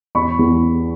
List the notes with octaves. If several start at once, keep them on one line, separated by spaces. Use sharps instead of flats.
E2 B5 C#6
E2